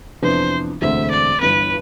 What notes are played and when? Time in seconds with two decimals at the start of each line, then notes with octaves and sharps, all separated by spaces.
0.22 F2 C3 E3 B3 D4 C5
0.81 E1 D2 D3 A3 C4 E5
1.10 D5
1.40 G1 G2 E3 B3 B4